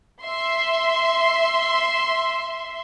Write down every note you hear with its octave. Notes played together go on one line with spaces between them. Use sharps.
E5 C6